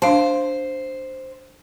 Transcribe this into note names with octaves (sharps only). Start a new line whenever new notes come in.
D4 C5 F5 A5